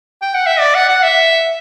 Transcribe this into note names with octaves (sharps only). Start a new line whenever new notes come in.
G5
F#5
E5
D5
F#5
F#5
E5